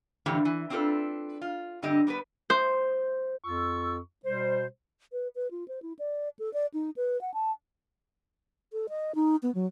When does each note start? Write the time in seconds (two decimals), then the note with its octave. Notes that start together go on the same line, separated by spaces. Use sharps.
0.26 F2 A2 D3 E3 G4
0.45 E3
0.70 C4 D4 F4 G#4 A4 B4
1.41 F4
1.82 G2 D3 C4 G4 D#5
2.07 G3 B3 G#4 B4
2.50 C5
3.44 F2 F4 C#6 E6
4.25 B2 G3 C5
5.12 B4
5.35 B4
5.51 F4
5.68 C5
5.82 E4
5.99 D5
6.39 A4
6.53 D5
6.74 D#4
6.96 B4
7.21 F#5
7.34 A5
8.73 A4
8.89 D#5
9.15 D#4
9.43 B3
9.55 F#3